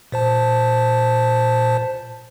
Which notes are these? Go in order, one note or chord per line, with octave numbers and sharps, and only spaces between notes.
A#2 C5 A5